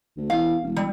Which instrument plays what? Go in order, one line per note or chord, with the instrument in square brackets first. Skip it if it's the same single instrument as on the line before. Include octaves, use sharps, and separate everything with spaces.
[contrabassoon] D2
[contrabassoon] E2 [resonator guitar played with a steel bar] F5
[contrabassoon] E1
[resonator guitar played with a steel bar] G3